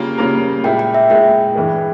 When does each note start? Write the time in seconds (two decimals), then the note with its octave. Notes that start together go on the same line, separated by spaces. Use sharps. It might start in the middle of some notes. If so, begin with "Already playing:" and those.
Already playing: C#3 G3 A#3 F4 A#4
0.18 C#3 G3 A#3 F4 A#4
0.64 A#2 G#3 E4 G5
0.79 G5
0.94 E5
1.10 A#2 G#3 E4 G5
1.55 G2 E3 G#3